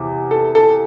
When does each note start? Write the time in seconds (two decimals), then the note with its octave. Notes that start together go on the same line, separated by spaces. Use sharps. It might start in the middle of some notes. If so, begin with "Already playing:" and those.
Already playing: E2 C3 E3
0.31 A4
0.55 A4